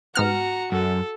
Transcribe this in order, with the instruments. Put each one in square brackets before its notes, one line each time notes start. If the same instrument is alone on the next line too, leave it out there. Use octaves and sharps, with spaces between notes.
[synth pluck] G#2 B3 F6 [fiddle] F#4 [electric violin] A#5 C#7
[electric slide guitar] F#2 [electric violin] A4